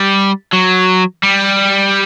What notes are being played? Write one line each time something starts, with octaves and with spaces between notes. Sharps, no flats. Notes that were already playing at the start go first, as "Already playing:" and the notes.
Already playing: G3
F#3
G3